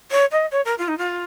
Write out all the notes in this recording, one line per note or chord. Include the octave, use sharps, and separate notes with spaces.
C#5
D#5
C#5
A#4
F4
D#4
F4